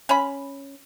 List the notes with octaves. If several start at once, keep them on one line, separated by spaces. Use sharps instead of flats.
C#4 B5